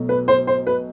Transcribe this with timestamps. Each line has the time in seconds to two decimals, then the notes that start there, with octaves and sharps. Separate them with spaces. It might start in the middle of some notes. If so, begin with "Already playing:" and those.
Already playing: B1 B2 F#3 A3
0.09 B4
0.28 C5
0.47 C5
0.67 B4